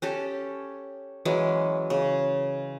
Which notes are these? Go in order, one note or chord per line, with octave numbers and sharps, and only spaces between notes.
C#4 G4 A4
E3 F#3 G#3 C#4
C#3